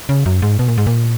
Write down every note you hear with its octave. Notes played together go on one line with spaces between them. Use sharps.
C#3
F#2
G#2
B2
A#2
G#2
A#2